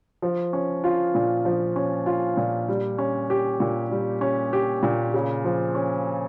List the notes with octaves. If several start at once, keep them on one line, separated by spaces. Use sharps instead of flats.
F3
C#4
F4
A#2
F3
C#4
F4
A#2
G3
C#4
G4
A#2
G3
C#4
G4
A#2
C#3
F3
C#4